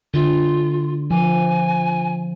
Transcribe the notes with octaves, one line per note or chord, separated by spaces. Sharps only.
D3 F4
F3 G#5